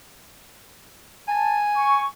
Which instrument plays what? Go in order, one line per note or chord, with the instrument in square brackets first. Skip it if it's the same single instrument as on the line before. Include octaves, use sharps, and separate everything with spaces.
[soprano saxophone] G#5 [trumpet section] A5
[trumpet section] C#6